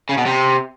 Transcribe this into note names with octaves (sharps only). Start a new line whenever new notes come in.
C#3
B2
C3